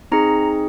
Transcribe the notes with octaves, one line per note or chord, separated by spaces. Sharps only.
C4 D#4 G#4 A#5